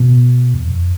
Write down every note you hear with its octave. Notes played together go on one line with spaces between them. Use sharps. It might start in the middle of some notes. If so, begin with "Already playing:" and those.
Already playing: B2
E2
F2